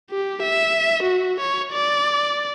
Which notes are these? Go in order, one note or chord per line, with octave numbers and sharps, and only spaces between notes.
G4
E5
F#4
C#5
D5